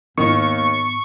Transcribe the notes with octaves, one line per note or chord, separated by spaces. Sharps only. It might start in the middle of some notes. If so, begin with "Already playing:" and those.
D#2 G#2 D#3 B3 C#6